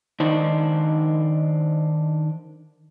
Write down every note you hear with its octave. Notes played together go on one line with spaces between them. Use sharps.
D#3 D4 D#4 C5